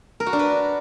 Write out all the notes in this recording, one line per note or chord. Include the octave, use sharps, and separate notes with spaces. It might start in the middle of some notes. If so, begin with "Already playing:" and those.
A#4
F#4
D4
B4